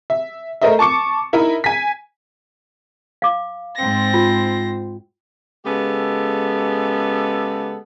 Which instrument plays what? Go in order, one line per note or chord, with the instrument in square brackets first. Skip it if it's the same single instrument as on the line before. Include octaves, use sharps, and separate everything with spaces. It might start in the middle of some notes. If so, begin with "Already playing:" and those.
[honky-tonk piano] E5
A3 A#4 C5 D#5 E5
A5 C#6 D6 C#7
D#4 E4 A#4 D#5 E5
G#5 B6
[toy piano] F5 D6
[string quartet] G#2 C4 A#6
[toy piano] F4
[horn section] C#3 G#3 B3 G4 A4